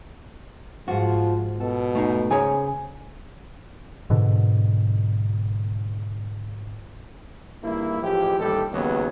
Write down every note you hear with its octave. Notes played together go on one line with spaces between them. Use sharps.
G#2 F3 F4 F#4
B2 A4
A3 D#4
C#3 G#4 C5 C#5 G#5 A#5
G#2 B2 D3
G#1 G2 A#3 E4
A1 F3 G#3 E4 G4
A1 D#2 A2 G3 G4 A4
D#2 C#3 F#3 A#3 B3